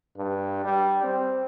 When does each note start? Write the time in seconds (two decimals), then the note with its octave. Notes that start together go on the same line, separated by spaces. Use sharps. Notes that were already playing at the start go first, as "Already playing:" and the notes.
0.17 G2
0.64 G3
1.04 C4